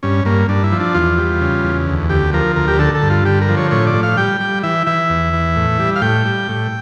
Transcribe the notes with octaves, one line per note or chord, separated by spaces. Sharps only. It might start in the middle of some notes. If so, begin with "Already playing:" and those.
G2 C#4
G2 A#3
G2 D4
E4
F3
D4
E2 F4
G3
C#3
E2
D2
D2 G4
F3 A#4
D2 A#4
G4
D3 A4
A4
G2
F4
D3 G4
A#4
F3
C#5
A2 C#5
D5
A2
F5
G3 G5
G3
E3 E5
E3 E5
E2
E3
A2
G3
F5
A2 G5
G3
A2